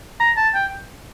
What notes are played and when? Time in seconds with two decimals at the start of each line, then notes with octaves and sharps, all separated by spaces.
0.20 A#5
0.37 A5
0.54 G5